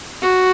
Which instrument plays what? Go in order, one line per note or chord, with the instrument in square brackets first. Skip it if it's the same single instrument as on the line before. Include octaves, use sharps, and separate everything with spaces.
[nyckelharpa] F#4